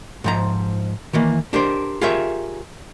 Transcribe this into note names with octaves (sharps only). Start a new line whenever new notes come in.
G#2 F3 A#5
D#3 E3 A#3
D4 G4 A#4 C5
F4 G4 G#4 A#4 C#5 E5